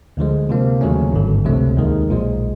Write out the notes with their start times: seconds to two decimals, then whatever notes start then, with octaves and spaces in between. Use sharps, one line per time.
0.17 D2 D3 F3 G#3
0.49 C3 F3 A#3
0.81 D#2 C#3 F#3 A3 C#4
1.13 G#1 G2 D3
1.45 C#2 C3 F3 A3
1.77 D#2 D#3 G#3
2.09 B1 A#2 F3 G#3